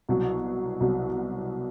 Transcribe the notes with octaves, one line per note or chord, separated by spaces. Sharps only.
C2 B2 F#3
C2 B2 F#3